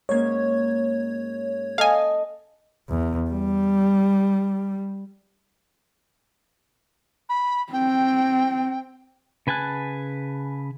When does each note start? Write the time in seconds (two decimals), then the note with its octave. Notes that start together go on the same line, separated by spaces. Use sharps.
0.09 G#2 A#3 C#4 C#5 G#6
1.78 A4 D#5 F5 G#5
2.89 E2
3.30 G3
7.29 B5
7.73 C4 G5
9.47 C#3 B4 G#5 A5 F#6